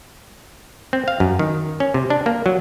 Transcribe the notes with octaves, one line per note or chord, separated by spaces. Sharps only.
C4
F5
F#2
D#3
C#4
C3
D4
A#3
F#3